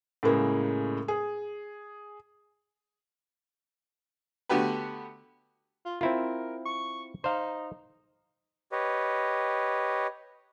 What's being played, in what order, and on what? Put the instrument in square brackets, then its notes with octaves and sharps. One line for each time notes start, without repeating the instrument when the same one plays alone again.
[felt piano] A2 C#3 G#3 A#3
G#4
[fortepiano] D3 A3 B3 F#4 G4 B4
[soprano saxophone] F4
[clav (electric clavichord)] C4 E4 F4 [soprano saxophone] A#4
[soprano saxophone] C#6
[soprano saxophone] D#4 [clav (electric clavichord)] C5 F5
[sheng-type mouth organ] G4 B4 C#5 D#5